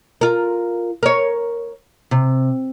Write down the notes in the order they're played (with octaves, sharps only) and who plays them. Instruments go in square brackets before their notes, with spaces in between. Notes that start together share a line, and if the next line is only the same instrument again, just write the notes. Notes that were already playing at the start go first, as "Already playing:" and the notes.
[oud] F4 A#4
A#4 C#5
C3